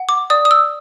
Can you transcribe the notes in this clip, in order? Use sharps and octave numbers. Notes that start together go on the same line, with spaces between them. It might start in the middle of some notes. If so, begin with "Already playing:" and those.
Already playing: F#5
D6
D5 D#6
D#6
E6